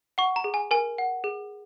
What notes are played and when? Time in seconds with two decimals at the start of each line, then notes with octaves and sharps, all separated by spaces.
0.18 F#5 C#6
0.36 A#5
0.44 G#4
0.54 G#5
0.71 A#4 G#5
0.98 F#5
1.24 G#4